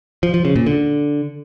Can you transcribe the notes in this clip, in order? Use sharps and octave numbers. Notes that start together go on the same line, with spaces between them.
F3
F3
C#3
A#2
D3